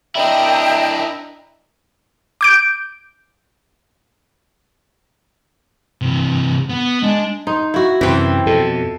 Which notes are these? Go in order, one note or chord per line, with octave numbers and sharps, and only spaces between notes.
D4 E4 A#4 D#5 E5 G5
D6 G6 D7
C3 E3
B3
G#3 D4
D#4 C6
E4 F#4
F#2 C3 E3 C4
F2 B2 A4